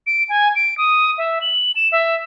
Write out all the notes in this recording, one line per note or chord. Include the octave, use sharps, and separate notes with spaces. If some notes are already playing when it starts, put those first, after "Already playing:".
D7
G#5
D7
D#6
E5
F#7
E7
E5